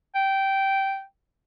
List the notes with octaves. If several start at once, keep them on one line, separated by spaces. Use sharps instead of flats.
G5